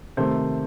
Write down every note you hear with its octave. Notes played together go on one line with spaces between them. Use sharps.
C3 D#3 A3 C5